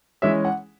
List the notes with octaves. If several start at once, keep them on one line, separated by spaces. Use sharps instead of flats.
E3 G#3 C#4 E5
F#5